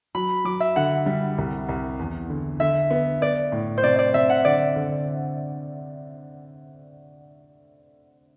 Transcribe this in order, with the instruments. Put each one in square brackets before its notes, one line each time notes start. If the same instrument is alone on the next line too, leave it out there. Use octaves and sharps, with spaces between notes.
[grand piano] F#3 [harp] B5
[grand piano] F#3 [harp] D6
[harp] E5
[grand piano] D3 [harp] F#5
[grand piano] G3
C2
C2
E2
D3
[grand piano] D3 [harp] E5
[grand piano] B3
[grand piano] B3 [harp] D5
[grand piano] A2
[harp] C5
[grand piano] C3 [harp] D5
[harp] D5
[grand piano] C3 [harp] E5
[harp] F#5
[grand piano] D3 [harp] D5
[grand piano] D3